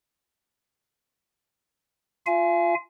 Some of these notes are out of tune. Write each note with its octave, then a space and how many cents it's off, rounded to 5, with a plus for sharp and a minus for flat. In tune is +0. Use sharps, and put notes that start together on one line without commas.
F4 +0 F5 -40 G#5 +20